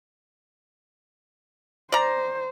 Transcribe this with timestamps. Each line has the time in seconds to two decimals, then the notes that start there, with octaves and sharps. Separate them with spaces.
1.92 C5 D5 A#5